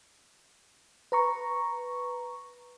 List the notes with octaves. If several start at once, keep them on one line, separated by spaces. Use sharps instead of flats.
B4 A#5 C#6